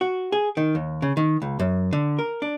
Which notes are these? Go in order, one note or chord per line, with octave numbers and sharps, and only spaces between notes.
F#4
G#4
D#3
D#2
C#3
D#3
C#2
F#2
D3
A#4
D4